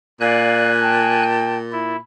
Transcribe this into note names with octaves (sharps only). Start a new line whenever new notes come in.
A#2 D5 F5 G#5 F#6
G5 A5
E4